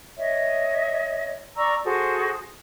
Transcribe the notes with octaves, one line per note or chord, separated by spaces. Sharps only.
C#5 D#5 E5
D5 A#5 C#6 E6
F#4 G#4 A4 C5